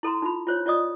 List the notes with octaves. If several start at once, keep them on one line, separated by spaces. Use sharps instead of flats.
E4 A4 A#5 C6
D#4 F4 B5
F4 C5 C#5
F4 D5 D#5 D#6